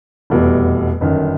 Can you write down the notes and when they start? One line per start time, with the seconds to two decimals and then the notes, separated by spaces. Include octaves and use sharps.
0.30 F1 E2 B2 G3
1.01 G1 F#2 D#3